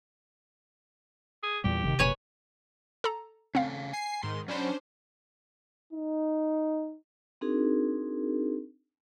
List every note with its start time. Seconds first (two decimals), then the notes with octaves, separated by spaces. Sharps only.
1.43 G#4
1.64 E2 A#2 G3 G4
1.84 G1 C3 D#3
1.99 F#1 A#2 B4 C#5 G#5
3.04 A4 A#5
3.55 C#3 A3 C4 F5
3.93 G#5 C7
4.23 G#2 D#3 C6
4.48 F#3 C#4 D4 C5 B5
5.93 D#4
7.41 C4 D4 D#4 F#4 G#4 A#4